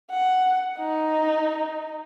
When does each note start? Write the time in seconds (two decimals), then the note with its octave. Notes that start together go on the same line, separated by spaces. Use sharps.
0.11 F#5
0.79 D#4